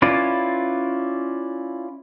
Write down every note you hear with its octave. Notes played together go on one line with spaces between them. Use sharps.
C#4 E4 F4 B4 D5